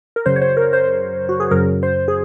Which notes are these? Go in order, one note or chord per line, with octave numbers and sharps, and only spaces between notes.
A#4
F#2 C#3 F#3 C5
C#5
C5
A#4
C5
F#4
G#4
F#2 C#3 F#3 A#4
C5
G#4